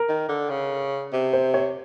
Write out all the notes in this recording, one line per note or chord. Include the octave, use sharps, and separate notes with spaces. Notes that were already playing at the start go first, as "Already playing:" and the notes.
Already playing: A#4
D#3
D3
C#3
C3
C5
C#5